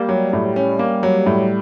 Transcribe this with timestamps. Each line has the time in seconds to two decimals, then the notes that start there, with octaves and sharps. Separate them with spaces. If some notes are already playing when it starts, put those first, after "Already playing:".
Already playing: G3 A#3
0.09 F#3
0.33 A2
0.56 C#4
0.79 A#3
1.03 F#3
1.26 A2